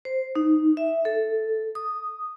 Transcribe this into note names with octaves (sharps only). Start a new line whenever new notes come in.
C5
D#4
E5
A4
D#6